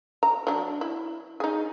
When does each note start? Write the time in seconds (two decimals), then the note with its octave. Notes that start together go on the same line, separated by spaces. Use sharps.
0.23 A#5
0.47 F#3 D4
0.81 E4
1.40 D#4 G#4